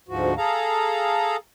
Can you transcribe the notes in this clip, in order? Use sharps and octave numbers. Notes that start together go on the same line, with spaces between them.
D2 G#2 F3 F#4
G#4 A4 F5 A#5